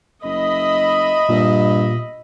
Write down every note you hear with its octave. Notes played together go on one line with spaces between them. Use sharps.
F#1 D#5 E5 B5
G2 A#2